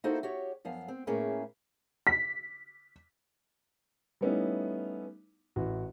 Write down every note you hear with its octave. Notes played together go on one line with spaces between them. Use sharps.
A#3 D#4 E4 F#4 A4 C5
F#4 G4 C#5
F#2 F3 B3 F5
C4
A2 A#3 C#4 G#4 B4
B6
G3 A3 B3 C#4 D#4 E4
A1 E4 F#4